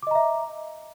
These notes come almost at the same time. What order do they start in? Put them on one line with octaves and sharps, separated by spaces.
D6 D#5 A#5 E5